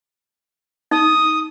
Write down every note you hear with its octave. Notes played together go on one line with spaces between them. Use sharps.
D#4 D#6